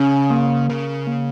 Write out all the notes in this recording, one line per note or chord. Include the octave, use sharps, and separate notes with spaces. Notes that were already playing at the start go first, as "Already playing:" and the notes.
Already playing: C#3 C#4
A#3
C#3 A#4
A#3